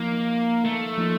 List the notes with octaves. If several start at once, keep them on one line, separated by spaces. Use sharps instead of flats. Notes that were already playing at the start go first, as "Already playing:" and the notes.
Already playing: F3 A#3 D#4
A3
F3 A#3 D#4